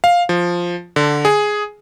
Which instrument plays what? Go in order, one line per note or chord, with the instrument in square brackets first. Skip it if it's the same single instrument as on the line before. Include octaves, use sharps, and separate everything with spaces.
[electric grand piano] F5
F3
D3
G#4